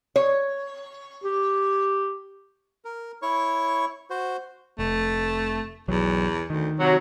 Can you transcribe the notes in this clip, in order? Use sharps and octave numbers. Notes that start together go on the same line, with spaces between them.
C#5
G4
A#4
E4 C#5 C#6
F#4 C5
F1 A3
B1 E2 F#3
D2 D#3
C3 F#3